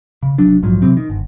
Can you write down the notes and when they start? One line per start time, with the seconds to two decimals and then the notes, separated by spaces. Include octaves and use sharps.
0.23 C#3
0.38 F1 F#3 D4
0.62 A#1 G#2 F3 F#3
0.82 C3 E3 F#3 C4
0.97 D#3
1.10 G1